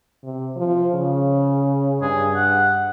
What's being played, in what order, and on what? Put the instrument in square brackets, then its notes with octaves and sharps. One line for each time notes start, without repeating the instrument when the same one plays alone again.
[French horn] C3
F3
C#3
[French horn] G2 [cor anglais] G#4
[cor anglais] F#5